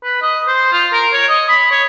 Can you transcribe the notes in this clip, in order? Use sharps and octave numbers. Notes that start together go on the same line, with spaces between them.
B4
D#5
C5
F4
A#4
C#5
D#5
B5
C#5